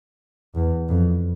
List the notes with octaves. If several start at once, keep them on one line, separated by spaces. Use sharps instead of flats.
E2
F2